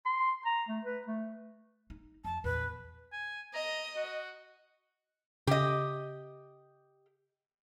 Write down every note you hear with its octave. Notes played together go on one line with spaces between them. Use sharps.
C6
A#5
A3
B4
A3
D#4
F2 A5
A#1 E2 B4
G#5
D#5 A#5
F#4
C#3 G4 D#5